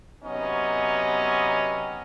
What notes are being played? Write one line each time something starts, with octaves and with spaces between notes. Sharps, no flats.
C3 F#3 B3 C#4 D#4 D#5